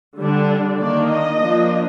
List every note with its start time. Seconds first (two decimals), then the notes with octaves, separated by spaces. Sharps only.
0.19 D3 G3 D4
0.80 D#3 A#3 D4 D5
1.10 D#5
1.41 F3 A#3 D4